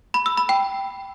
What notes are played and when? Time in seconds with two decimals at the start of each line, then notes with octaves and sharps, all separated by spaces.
0.14 B5
0.26 E6
0.37 B5
0.49 G5